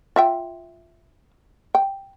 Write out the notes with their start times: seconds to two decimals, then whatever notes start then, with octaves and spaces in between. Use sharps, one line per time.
0.16 F4 E5 G5
1.75 G5